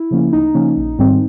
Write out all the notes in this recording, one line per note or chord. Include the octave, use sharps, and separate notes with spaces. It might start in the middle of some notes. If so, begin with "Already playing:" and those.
Already playing: E4
C#3 F3 A#3 C#4
D2 D#4
C#3 F3 A#3 C#4
A#1
G#2 D#3 G3 C4